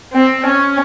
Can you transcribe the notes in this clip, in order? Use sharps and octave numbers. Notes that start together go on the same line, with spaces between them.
C4
C#4